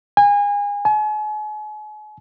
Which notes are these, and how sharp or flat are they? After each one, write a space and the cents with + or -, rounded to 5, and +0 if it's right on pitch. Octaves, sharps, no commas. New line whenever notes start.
G#5 -30
G#5 +40